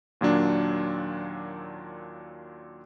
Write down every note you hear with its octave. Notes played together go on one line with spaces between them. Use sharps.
D#2 A#2 F#3 D4